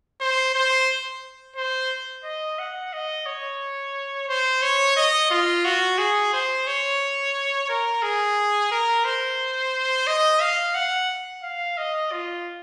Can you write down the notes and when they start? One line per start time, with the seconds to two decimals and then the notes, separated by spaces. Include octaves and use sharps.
0.21 C5
0.55 C5
1.56 C5
2.24 D#5
2.59 F#5
2.93 D#5
3.26 C#5
4.29 C5
4.62 C#5
4.96 D#5
5.30 F4
5.65 F#4
5.98 G#4
6.33 C5
6.67 C#5
7.69 A#4
8.03 G#4
8.72 A#4
9.05 C5
10.07 D#5
10.41 F5
10.75 F#5
11.43 F5
11.78 D#5
12.12 F4